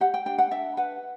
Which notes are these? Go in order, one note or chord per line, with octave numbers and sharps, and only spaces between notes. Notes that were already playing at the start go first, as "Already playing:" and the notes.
G4 F#5
G5
D4 G5
F#5
D4 E5
B4 F#5